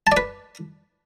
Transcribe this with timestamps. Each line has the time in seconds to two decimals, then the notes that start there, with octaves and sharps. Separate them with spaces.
0.07 A5
0.12 D5
0.17 B4